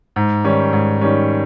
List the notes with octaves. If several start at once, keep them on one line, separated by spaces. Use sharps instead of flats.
G#2
D#3 G3 C#4
G#2
D#3 G3 C#4